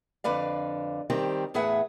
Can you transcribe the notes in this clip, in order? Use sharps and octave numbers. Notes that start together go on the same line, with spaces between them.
F2 D3 B4 D5 F5
D#3 G3 C4 G4
E2 A2 G#4 B4 E5 F#5